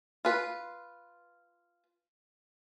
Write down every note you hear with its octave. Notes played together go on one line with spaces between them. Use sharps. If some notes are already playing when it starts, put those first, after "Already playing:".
F4 B4